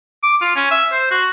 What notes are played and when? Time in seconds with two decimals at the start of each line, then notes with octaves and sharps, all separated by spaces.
0.23 D6
0.41 F4
0.56 C#4
0.71 E5
0.92 C5
1.11 F#4